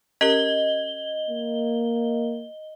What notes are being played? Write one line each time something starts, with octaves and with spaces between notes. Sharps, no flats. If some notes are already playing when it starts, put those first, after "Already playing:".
C#4 G4 A#4 D#5 G7
A#3